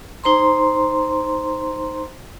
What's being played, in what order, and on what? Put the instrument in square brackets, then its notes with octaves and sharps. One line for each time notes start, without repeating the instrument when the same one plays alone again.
[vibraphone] D#4 C5 A#5 C6